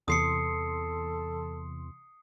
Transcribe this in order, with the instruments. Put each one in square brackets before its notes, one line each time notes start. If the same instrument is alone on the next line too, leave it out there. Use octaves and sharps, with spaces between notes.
[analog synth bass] E2 [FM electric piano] C3 E3 C6 [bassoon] A4 [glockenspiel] D#6 C7 C#7